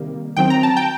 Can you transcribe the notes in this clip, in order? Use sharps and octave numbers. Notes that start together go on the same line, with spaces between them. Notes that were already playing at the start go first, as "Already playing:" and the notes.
Already playing: C3 D#3 G3 A#3
D#3 F#3 C4 G5
A#5
A5
G5